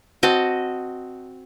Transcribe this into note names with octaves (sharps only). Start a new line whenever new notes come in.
C4 F#4 D#5 A5